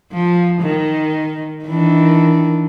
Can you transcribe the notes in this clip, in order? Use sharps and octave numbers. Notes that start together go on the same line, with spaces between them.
F3
D#3
D#3 E3 D4